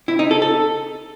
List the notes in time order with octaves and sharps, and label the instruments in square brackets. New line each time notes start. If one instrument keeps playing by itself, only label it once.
[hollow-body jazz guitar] E4
D#4
A4
A4